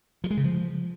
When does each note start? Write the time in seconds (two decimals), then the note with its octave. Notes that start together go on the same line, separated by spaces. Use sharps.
0.24 F3
0.31 G#3
0.37 C#3
0.44 F3